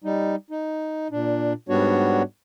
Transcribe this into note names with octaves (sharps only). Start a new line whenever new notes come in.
G3 D#4
D#4
A#2 D4
G#2 G3 B3 D4 F#4 C#5